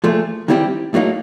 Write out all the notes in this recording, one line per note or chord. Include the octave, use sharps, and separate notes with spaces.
A#2 F3 A3
D#3 G3 C4 E4 G4
A2 F#3 A#3 D#4